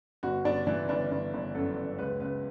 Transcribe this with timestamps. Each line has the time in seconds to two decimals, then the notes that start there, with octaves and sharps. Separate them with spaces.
0.23 G1 F#4
0.44 G1 D4
0.67 E3 D4
0.89 G1 D4
1.11 G1
1.33 G1
1.55 F#2 A4
1.77 F#2
1.98 C#2 B4
2.20 C#2 B4